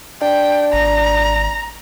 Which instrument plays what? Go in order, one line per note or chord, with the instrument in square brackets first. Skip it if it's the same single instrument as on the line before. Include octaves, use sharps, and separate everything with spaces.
[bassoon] D4 [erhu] G5
[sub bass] G#1 [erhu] A#5